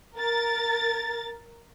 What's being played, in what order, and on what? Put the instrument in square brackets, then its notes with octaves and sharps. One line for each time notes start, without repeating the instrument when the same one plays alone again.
[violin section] A#4 A6